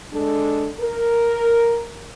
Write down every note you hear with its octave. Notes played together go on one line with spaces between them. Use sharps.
G#3 D4 A4
A#4